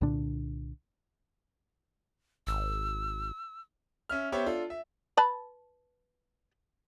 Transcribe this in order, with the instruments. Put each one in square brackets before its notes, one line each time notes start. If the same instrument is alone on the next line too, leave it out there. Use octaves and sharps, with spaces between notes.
[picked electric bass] C2 A#2 D3 D4
[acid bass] G#1 [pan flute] E6
[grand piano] C#4 E5 F6
B3 G4 C5 C#5 E5
D4 F4 A4
E5
[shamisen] B4 A5 B5